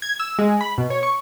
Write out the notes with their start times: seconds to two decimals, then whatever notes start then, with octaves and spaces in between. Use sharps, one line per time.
0.02 G#6
0.20 E6
0.38 G#3
0.61 B5
0.78 B2
0.90 C#5
1.03 C#6